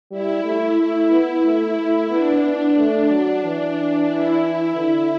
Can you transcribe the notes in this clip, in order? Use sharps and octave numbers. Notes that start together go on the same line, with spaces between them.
G3 E4
A3
A3 E4
B3
A3
A3
B3 D4
B3
A3
F#3
E3 D4
E4
D3